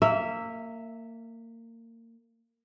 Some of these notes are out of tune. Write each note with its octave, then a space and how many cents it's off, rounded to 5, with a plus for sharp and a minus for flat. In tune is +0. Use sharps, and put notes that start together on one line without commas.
A#3 -25 E5 -5